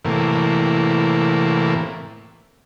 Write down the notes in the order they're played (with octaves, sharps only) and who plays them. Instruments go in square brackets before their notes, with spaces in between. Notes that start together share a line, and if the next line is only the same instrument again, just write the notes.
[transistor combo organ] A2 C3 E3 A#3